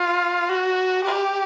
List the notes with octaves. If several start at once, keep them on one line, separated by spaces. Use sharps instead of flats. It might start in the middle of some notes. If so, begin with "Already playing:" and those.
Already playing: F4
F#4
G4